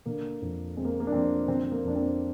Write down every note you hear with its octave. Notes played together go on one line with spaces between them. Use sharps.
D3 A#3
F2
G#3 C4
A#3
A#3
D4
F2 C4
D3 C4
A#3
F2 D4
C4